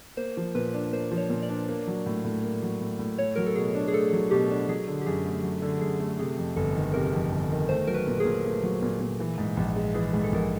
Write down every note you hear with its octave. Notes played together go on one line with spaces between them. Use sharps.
A#3 C5
F3
A#2 B4
D4
A#3 C5
F3
C#5
A#2
D5
D4
A#3
F#3
A2
A2
A#3
F#3
A2
A2
A3 C#5
F#3 A#4
A4
B2 G#4
D4
G#4
A3 A4
F#3
B2 G4
D4
F#3 G#4
D3
G4
F#2 G#4
A3
F#3
D3
F#2 G#4
A3
C3 G#4
F2
G1 A4
D#3
C3 A#4
F2
G1
D#3
A3 C5
F#3 A#4
B4
A#2
G#4
A#2
A3
F#3
A#2
A#2
E3
G#2
A#1
G#3
E3 G#4
G#2 G#4
A4
A#1 A#4